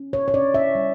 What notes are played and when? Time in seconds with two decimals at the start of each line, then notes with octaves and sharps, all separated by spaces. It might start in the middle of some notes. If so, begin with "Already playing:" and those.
Already playing: C#4
0.13 C#5
0.28 C#5
0.34 C#4 D5
0.54 E5
0.75 G3